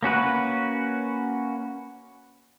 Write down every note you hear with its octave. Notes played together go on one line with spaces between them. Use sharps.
A#3 C#4 F#4 B4